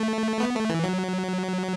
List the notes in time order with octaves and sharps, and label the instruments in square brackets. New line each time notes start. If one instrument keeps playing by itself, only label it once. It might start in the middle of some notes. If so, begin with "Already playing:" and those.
Already playing: [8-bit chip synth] A3
B3
A3
E3
F#3